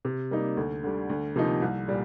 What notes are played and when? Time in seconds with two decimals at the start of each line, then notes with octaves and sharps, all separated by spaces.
0.05 C3
0.31 G3 A#3 D#4
0.57 D2
0.84 D3 G3
1.09 D2
1.36 C3 F3 A#3 D#4
1.61 C2
1.88 A#2 G3